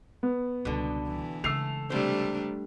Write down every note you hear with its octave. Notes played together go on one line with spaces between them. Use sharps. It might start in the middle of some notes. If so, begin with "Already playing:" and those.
B3
C#2 B2 D3 G3
E3
C#3 G#3 A3 E6 C7 F7
C3 G3 A3 D4 C5